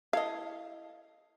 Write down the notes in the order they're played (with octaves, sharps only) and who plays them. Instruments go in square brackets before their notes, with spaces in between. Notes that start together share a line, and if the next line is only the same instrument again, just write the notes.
[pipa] E4 A4 D#5 [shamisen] F5